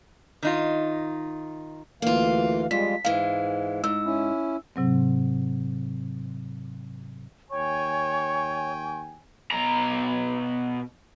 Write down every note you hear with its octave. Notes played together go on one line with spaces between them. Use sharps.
D#3 D#4 F4
D2 E3 A#3 F4 F5
F2 G3 G#3 F4 B6
G#2 E3 G#3 F5
G#2 E6
C#4 E4
G#2 C3 F#3 C4
D#2 C#5 G5 G#5 C#6
B2 A#5